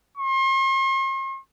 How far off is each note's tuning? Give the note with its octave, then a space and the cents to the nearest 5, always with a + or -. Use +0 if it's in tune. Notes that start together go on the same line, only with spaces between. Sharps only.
C6 +45